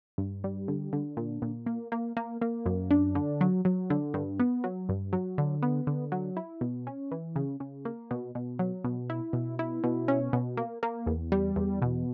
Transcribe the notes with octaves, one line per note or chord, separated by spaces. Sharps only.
G2
G3
D3
D3
A#2
A#2
A#3
A#3
A#3
A#3
F#2
D4
D3
F#3
F#3
D3
G2
B3
F#3
G2
F#3
D3
B3
D3
F#3
E4
B2
C#4
E3
C#3
C#3
A#3
B2
B2
F#3
B2
E4
B2
E4
B2
C#4
B2
A#3
A#3
E2
G3
E2
B2